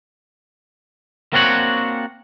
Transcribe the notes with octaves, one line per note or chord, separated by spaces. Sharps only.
A#3 C4 D4 F#4 C#5 F#5